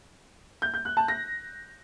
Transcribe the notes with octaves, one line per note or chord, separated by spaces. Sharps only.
G6
G6
F#6
A5
A#6